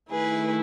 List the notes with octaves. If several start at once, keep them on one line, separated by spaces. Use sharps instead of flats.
D#3 A3 E4 G#4 B4